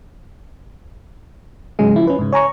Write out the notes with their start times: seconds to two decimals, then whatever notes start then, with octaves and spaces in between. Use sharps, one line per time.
1.79 G#2 C#3 F#3 G#3 G#4
1.96 F3 E4
2.07 C#4 B4
2.19 G#2 C#3
2.33 C#5 G#5 A#5 C#6